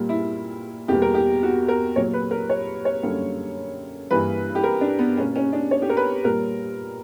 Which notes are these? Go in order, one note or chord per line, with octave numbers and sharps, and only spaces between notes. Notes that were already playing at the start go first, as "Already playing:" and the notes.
Already playing: A#2 G3 A#3
E4
E2 B2 G3 A#3 G4
A#4
G4
F#4
A#4
A#2 F#3 A#3 C#5
B4
A#4
C#5
C#5
F#2 D3 G3 A#3
G2 E3 G3 A#3 B4
G4
A#4
D4
B3
B2 A#3 C#4
C#4
D4
C#5
G4
A#4
B4
A#2 G3 A#3 A#4